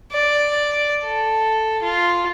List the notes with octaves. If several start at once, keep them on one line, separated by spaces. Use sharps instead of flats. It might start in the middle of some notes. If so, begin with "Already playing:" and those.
D5
A4
F4